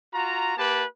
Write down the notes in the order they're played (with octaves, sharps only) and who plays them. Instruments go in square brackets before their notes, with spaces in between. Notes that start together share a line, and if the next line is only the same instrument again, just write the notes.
[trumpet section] F4 F#4 A#5
A#3 G4 B4 A5